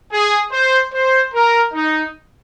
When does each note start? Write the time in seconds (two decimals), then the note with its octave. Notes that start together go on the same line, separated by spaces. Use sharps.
0.11 G#4
0.51 C5
0.92 C5
1.33 A#4
1.73 D#4